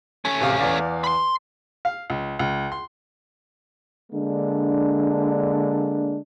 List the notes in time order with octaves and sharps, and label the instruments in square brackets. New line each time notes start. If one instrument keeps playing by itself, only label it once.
[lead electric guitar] A3 C#4
[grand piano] D1 C3 F5
E2 D5 F5
[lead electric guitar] B5 C6
[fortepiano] F5
C#2
C#2
C6
[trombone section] D3 G#3 A#3 D4